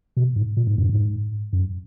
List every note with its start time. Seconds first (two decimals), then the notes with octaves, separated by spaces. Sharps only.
0.17 B2
0.36 G#2
0.57 A#2
0.67 G#2
0.78 F#2
0.89 G#2
1.53 F#2